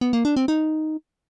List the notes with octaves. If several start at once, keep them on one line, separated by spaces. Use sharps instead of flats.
B3
A#3
D4
C4
D#4